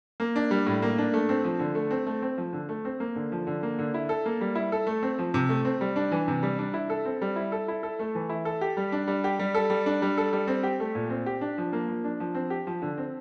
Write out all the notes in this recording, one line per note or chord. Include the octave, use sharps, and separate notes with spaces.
A#3
D4
G3
A2
A#3
D4
A3
C4
F3
D3
A3
C4
A3
C4
F3
D3
A3
C4
A#3
D3
F3
D3
A#3
D3
E4
A4
A#3
G3
E4
A4
A3
C4
F3
C3
A3
C4
G3
D4
E3
C3
G3
D4
E4
A4
C4
G3
E4
A4
E4
A4
A3
E3
E4
A4
G4
G3
D4
G3
G4
G3
A4
G3
D4
G3
A4
G3
C4
G4
A3
A#2
C4
G4
D4
F3
A#3
F3
D4
F3
C4
G4
F3
D3
C4